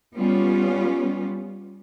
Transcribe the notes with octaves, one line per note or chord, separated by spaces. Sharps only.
G3 B3 C#4 F4